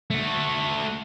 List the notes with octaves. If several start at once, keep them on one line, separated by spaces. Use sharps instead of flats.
A3 F#4